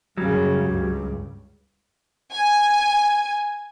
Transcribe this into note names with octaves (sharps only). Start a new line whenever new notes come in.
F#2 C#3 F#3 G3
C#2 G2
G#5